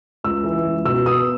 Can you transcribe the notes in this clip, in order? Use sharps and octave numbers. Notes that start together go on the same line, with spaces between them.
C#2 E6
E3
C#2
B2 E6
B3 D#6